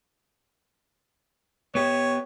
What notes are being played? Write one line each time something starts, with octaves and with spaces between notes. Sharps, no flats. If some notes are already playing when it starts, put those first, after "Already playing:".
B3 G4 C#5